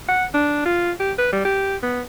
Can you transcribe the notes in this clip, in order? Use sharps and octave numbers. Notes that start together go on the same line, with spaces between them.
F#5
D4
F4
G4
B4
G3
G4
B3